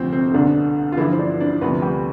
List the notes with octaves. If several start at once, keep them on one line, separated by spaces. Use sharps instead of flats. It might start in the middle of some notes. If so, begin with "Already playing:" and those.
Already playing: D2 C3 F3 C4
C4
C4
C2 B2 D3 D4
F4
G2 D3 E3 F3 E4
C5
D4 D5
D4 D5
D2 C3 F3 B3 B4
G3 G4